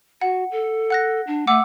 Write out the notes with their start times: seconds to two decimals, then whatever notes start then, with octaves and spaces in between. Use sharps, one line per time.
0.21 F#4 F#5
0.51 A4
0.90 F#5 F#6 A#6
1.27 D4
1.47 A3 F#5 D6 E6